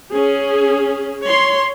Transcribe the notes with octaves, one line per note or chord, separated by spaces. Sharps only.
C#4 G#4
C#5 C6